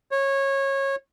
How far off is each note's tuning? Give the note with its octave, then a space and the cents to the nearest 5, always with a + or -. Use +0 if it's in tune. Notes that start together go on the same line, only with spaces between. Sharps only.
C#5 -20